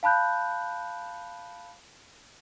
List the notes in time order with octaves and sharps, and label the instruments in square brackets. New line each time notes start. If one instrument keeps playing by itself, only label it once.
[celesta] F5 A5 B5 F#6 G6